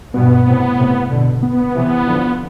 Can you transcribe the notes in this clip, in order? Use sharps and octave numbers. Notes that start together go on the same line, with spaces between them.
G2 B2 B3
A2 C3
A2 C3
B2 D3
B3
C3 E3
D3 F3